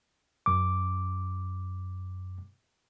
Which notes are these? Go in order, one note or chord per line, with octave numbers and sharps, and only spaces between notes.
F#2 D6